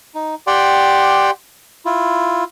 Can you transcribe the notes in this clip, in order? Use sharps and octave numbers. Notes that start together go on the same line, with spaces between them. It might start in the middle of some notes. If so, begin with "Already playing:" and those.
D#4
G4 D5 F#5 G5 C6
E4 F4